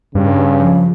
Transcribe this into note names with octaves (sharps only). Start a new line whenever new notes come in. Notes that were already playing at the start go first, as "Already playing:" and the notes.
G2 C#3
F3